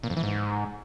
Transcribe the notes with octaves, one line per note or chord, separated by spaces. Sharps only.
A#2
F2
E3
G#2